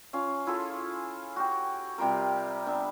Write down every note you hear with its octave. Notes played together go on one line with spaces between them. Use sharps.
C#4 F4 F5
E4 F4 G#4 A4
F#4 G4
C3 G3 F4 A#4
B3 D4 E5